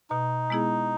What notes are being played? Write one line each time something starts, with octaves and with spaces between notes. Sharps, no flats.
B2 D#4
G#3 B3 E4 G#4